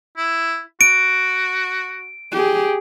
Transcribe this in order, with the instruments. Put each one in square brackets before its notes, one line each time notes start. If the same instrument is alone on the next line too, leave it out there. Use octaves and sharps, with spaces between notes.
[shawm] E4
[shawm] F#4 [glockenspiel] D7
[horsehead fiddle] G4 G#4